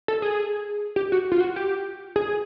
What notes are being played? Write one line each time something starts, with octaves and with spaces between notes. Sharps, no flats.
A4
G#4
G4
F#4
F4
F#4
G4
G#4